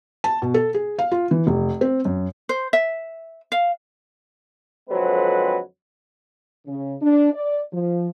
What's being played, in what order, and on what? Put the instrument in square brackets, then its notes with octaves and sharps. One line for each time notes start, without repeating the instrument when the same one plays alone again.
[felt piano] A5
B2
A4
G#4
F5
F4
E3
F1
C4
F#2
[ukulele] C5
E5
F5
[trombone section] F2 D3 F#3 G#3 C4 B4
[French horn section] C#3
D4
D5
F3